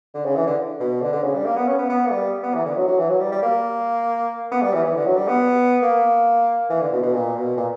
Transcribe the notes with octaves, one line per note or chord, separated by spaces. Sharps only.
D3
C#3
E3
D3
B2
D3
D3
C#3
G3
A#3
B3
C#4
B3
B3
A#3
G3
B3
E3
D3
F#3
F#3
E3
F#3
G3
G3
A#3
B3
G3
E3
E3
D3
F#3
G3
B3
A#3
E3
D3
B2
B2
A#2
B2
A#2